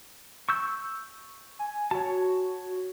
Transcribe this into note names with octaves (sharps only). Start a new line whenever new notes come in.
C#6 E6 G6
G#5
F#4 C#5 A5